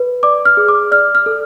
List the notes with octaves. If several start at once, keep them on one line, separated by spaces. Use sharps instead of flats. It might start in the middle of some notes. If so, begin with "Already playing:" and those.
Already playing: B4
D5 D6
F6
G#4
D6
D5 F6
F6
A4